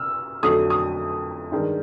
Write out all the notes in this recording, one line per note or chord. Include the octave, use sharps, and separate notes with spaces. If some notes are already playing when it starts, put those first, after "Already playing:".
Already playing: E6 F6
F2 D3 F#3 A3 D#6
D#6
G2 D#3 G#3